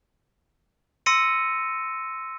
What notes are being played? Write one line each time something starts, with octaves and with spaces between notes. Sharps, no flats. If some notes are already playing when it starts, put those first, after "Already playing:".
C6 E6 A#6 C#7 D#7